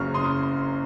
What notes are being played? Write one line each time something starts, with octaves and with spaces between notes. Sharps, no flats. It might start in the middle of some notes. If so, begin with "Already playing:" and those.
Already playing: F#1 F#2 C#3 F#3 C#6 F6
C6 D#6